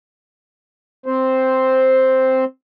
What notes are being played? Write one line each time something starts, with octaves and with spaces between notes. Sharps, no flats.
C4 C5